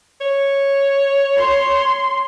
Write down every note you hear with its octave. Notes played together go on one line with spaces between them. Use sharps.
C#5
C6